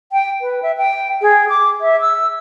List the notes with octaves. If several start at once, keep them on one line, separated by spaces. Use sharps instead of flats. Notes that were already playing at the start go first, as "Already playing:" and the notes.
G5
B4
E5
G5
G#4
D6
E5
E6